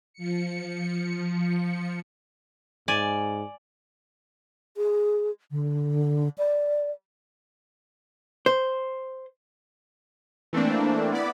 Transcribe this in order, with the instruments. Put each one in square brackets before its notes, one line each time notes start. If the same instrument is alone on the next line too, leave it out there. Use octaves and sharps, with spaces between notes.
[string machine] F3 C#7
[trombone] G#2 [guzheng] D5 G#5
[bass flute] G#4
D3
D5
[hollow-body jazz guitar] C5
[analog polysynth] E3 A3 A#3 C4 D4
B3 E4 D5 B5